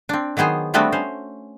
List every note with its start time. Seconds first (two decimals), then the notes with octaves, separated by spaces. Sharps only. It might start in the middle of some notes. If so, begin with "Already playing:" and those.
0.09 C4 D4
0.37 D#3 F#3 B3 G#4 C5
0.74 G3 A3 B3 C4 D4 F#4
0.92 C#4 C5